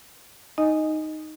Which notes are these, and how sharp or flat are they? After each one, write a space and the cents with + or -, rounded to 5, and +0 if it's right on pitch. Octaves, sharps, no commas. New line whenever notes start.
D#4 +0 D#5 +0 G#5 +0